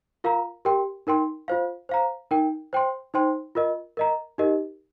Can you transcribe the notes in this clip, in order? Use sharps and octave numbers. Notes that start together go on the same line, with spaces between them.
F4 A#4 F5 A#5
G4 A#4 G5 C6
D#4 A#4 G5 C6
F4 C5 F5
C5 F5 A#5
D#4 A#4 G5
C5 G5 C6
D#4 C5 G5 C6
F4 A#4 D#5
A#4 D#5 A#5
D#4 G4 A#4 D#5